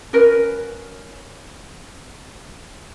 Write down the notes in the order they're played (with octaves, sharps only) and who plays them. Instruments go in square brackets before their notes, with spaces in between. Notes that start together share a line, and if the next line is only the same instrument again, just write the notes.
[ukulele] C#4 F#4 A#4 B4